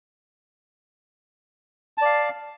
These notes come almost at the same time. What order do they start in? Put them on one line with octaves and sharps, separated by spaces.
A5 D5 F5